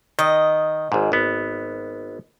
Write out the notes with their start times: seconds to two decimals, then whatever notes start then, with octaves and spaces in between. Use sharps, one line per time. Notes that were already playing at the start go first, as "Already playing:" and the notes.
0.19 D#3 D#5
0.92 G#1 G#2
1.12 G#1 B3